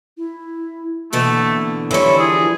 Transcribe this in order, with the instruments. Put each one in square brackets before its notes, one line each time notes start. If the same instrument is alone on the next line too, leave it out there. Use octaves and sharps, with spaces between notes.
[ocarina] E4
[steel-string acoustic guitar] B2 D3 E3 [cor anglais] A3 [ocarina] A#3
[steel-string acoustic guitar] D3 G3 [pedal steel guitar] E3 F3 C#6 [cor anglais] E4 [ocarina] C#5
[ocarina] E4 [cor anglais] G#4